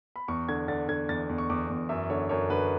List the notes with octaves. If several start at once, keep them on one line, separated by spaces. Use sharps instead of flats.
B5
E2 C#6
D3 G#6
D3 A6
D3 G#6
E2 A6
E2
C#6
E2 D6
E2
F#2 E5
D3 C#5
F#2 C#5
D3 B4